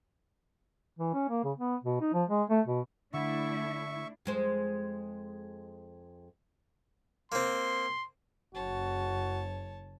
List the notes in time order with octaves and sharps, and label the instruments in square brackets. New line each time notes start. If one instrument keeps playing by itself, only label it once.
[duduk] E3
C#4
A#3
C#3
B3
B2
D#4
F3
G#3
A3
B2
[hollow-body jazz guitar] D3 [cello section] A3 D4 E4 [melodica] E5 C#6
[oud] F2 G#3 C5
[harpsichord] A#3 C4 [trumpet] C6
[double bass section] F#1 [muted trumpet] F#4 [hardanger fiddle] C#5 A5